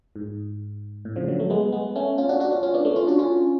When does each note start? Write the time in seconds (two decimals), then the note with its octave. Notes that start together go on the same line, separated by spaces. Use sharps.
0.16 G#2
1.05 A2
1.16 C#3 F3
1.28 D3 F#3
1.39 F#3 A3
1.50 G#3 B3
1.72 G#3 B3
1.96 A3 C#4
2.18 C#4 F4
2.29 D4 F#4
2.40 D4 F#4
2.52 C#4 F4
2.63 C#4 F4
2.74 B3 D4
2.85 A3 C#4
2.96 C#4 F4
3.07 D4 F#4
3.19 C#4 F4